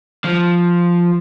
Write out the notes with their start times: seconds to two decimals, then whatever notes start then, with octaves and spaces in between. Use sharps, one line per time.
0.24 F3